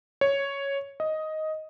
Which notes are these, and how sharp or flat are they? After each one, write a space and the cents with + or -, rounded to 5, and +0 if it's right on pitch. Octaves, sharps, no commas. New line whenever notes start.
C#5 +0
D#5 +10